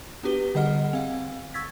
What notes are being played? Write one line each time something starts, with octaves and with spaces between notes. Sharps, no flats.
B3 D4 F#4 G4 B4 G7
D3 G3 G#4 D#5 F#5 F6
C4 F5
C#6 E6 G#6 A6 B6